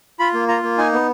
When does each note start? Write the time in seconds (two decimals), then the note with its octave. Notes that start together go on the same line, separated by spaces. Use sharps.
0.19 F4 B5
0.34 A#3
0.48 F4 A#5
0.63 A#3
0.78 D#4 G#5
0.93 B3